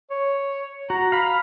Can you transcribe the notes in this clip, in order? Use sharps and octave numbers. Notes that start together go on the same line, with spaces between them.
C#5
F#4 A#5
F5 B5